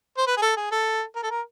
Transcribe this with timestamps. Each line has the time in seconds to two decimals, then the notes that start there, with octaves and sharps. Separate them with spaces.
0.18 C5
0.27 B4
0.37 G#4
0.42 A4
0.57 G#4
0.71 A4
1.16 A#4
1.23 A4
1.30 A#4